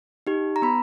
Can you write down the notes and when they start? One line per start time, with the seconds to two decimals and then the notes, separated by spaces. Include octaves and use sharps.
0.27 D#4 G4
0.56 A#5
0.62 B3 B5